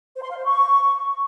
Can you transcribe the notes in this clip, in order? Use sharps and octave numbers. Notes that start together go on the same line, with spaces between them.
C5
C6
F5
C5
C#6